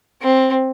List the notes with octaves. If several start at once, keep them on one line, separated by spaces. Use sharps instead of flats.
C4